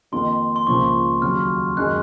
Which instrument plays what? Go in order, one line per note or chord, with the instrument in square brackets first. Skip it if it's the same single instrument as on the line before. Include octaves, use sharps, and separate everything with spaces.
[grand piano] F2 D#3 A#3 [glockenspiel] C6
[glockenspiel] C6
[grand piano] C#2 C#3 F3 A#3 [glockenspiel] C#6
[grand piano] D#2 C#3 F#3 [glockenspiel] F6
[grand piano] F#2 D#3 G#3 D#4 G#4 [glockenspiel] F#6